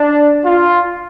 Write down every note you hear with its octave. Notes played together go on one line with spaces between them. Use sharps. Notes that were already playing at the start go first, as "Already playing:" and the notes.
Already playing: D4
F4